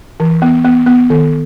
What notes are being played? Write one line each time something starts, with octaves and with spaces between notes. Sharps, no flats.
E3
B3
B3
B3
D#3